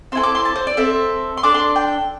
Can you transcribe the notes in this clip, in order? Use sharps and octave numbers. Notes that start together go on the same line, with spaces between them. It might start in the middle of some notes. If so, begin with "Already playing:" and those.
C4 E4 A4 C6
D6
C6
A5
C5
D5
C4 A4 E5
C6
D4 A4 D6
C6
G5